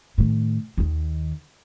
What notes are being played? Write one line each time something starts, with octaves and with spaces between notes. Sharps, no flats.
A2 D#3
D#2 D#3